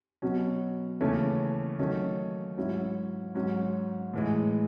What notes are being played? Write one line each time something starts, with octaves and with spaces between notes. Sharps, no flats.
B2 F#3 C#4
D#2 C#3 E3 A3 C#4
D#3 F#3 A3 C#4
G#2 F#3 C#4 E4
G#2 F#3 C#4
A2 E3 G#3